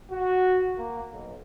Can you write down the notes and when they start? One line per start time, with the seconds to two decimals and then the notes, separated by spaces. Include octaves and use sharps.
0.11 F#4
0.77 A#3
1.12 B1